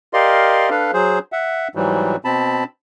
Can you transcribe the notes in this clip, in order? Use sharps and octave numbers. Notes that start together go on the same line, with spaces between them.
G4 A#4 D5 D#5 F5 C6
D4 A4 B4 F5
F#3 G#4 C5
E5 F#5
G#2 E3 F#3 G3
B2 C4 A5 B5